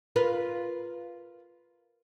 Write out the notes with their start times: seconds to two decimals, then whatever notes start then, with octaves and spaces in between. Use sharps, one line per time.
0.16 F4 A#4 B4